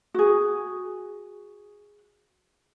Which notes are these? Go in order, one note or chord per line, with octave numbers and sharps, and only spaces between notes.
F#4 G#4